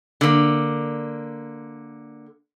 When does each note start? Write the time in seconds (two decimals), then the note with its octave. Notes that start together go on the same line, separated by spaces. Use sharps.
0.21 D3 A#3